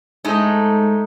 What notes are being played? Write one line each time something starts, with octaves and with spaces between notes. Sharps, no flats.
G#2 G#3 A3 D#4